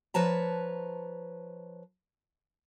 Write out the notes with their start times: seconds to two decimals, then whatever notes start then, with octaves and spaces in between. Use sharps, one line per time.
0.14 F3 B4 C#5 A5 A#5